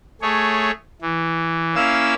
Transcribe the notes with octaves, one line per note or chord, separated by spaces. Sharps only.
A3 G#4 C#5
E3
A#3 C#4 E4 F5 E6